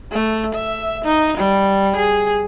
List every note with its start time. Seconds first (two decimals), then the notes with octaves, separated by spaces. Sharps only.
0.12 A3
0.55 E5
1.05 D#4
1.38 G3
1.96 G#4